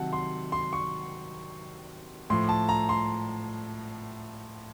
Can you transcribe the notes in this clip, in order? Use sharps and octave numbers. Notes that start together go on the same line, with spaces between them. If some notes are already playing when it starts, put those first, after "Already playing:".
Already playing: C3 D#3 F#3 F#5 A5
C6
C6
C#6
A2 F3 C6
A5
A#5
C6